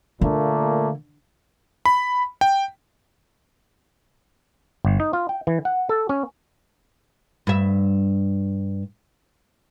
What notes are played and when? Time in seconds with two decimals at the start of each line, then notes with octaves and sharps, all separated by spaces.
0.21 A#2 D3 A3 A#3
1.85 B5
2.41 G5
4.85 G1
5.00 D#4
5.13 F4
5.29 G5
5.47 E3
5.65 F#5
5.89 A4
6.09 C#4
7.47 G2 E5